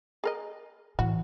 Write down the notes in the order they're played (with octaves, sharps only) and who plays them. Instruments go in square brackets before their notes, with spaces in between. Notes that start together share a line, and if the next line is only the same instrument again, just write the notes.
[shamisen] G#4 A#4 D#5
[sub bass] A2 [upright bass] E3 [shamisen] F#4